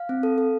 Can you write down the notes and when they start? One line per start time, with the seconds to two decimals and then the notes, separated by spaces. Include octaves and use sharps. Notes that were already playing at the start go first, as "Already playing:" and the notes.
Already playing: F5
0.09 C4
0.23 A4
0.38 A4